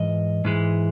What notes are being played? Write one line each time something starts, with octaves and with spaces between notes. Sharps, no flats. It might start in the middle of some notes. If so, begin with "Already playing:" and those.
Already playing: G#2 E3 D#5
G#2 E3 G#3